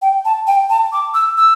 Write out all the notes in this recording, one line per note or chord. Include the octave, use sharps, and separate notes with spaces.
G5
A5
G5
A5
D6
E6
E6